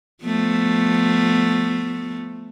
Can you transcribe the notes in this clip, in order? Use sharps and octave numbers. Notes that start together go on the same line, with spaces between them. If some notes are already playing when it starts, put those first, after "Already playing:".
F3 A3 B3